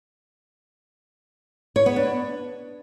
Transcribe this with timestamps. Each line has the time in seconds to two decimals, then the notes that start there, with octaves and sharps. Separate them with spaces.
1.76 C#5
1.86 B3
1.96 D4